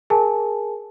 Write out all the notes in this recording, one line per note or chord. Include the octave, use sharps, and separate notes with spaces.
G#4 A#4 G#5 A5